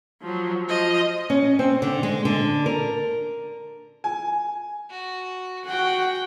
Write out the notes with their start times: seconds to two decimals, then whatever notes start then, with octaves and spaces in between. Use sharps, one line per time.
0.21 F3 F#3
0.68 F3 D#5
1.30 C#4
1.59 C4
1.82 D3
2.03 G#3
2.25 D3
2.66 A#4
4.04 G#5
4.90 F#4
5.66 F#4 G#4 F#5 G5